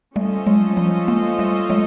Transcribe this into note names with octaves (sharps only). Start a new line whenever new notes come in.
G3 A3 C#4 F4 A4 C5 D#5
F#3 G#3
F3 G3
G#3 A#3
G3 A3
F#3 G#3